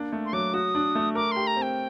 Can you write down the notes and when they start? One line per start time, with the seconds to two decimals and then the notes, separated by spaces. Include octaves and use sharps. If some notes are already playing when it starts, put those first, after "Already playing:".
Already playing: A#3 D4
0.13 A3
0.25 C6
0.33 F#3 D6
0.54 F#4 D#6
0.75 D4
0.95 A3
1.15 A#4 D6
1.31 G4 C6
1.47 A#5
1.56 C4
1.62 G5